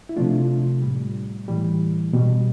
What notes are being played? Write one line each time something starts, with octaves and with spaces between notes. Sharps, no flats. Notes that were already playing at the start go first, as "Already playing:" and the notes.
E4
C3 F3 A3 D4 F4
A2 G3
A2 E3 G3
B2 G3